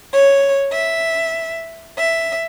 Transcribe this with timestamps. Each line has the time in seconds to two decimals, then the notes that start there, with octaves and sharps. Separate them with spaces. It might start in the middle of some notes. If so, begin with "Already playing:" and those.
0.12 C#5
0.73 E5
1.98 E5